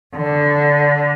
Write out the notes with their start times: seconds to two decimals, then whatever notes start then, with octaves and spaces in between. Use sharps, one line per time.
0.14 D3